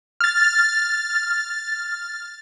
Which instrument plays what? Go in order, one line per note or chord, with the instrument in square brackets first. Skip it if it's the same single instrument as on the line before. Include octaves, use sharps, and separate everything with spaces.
[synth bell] F6 A6